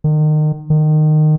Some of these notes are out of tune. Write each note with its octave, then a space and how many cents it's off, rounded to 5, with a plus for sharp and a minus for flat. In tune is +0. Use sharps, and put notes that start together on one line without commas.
D#3 -30
D#3 -20